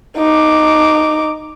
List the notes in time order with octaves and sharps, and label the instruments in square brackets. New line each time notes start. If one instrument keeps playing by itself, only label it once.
[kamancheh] D#4 D6